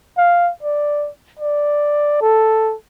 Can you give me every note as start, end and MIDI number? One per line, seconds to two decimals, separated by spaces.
0.17 0.51 77
0.63 1.09 74
1.39 2.18 74
2.22 2.74 69